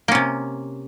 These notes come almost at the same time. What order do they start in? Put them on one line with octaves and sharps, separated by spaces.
A#3 C#4 C3